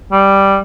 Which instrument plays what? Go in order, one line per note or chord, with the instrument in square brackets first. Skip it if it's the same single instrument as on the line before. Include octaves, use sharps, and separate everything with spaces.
[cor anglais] G3